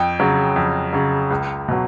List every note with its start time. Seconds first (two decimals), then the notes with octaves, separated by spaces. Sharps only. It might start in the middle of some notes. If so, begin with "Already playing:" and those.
Already playing: F2 G5
0.20 C#3 F#3
0.56 F2
0.93 C#3 F#3
1.31 C#2
1.68 B2 F#3